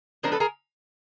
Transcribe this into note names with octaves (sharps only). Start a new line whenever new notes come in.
F3 G#3 B3 D4 A#4 C5
A4 B4
G#4 A#4